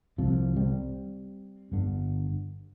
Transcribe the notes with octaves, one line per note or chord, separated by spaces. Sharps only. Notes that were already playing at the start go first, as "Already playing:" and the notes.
C2 C3 F3
G3 C4
G1 G2 D3